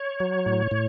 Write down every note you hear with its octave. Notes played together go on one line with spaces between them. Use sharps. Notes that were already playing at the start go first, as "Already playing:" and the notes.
Already playing: C#5
F#3
A2
A2